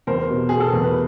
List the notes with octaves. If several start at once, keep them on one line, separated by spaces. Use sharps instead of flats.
E2 A#4 C5
B2
B2 G#4
A4
E2 A#4
B4